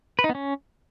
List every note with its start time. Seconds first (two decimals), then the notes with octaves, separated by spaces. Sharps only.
0.19 B4
0.24 D#4
0.29 B3
0.35 C#4